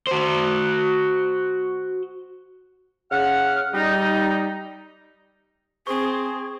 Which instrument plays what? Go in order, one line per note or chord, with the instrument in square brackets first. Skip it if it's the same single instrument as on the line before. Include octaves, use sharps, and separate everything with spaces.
[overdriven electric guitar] F#4 C5
[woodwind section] C#3 F#5 F6
G3 D#4
[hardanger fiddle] C4 [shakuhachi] G#4 [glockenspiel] C#6